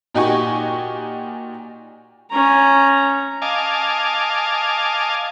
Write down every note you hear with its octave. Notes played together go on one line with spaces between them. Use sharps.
A#2 D#4 F#4 G4 G#5 C#6
C#4 A#5
D#5 F5 G#5 A5 D6